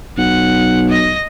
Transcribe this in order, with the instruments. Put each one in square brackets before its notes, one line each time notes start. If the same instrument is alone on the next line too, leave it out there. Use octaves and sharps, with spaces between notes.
[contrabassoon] B1 [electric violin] F#5
[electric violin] D#5 A#6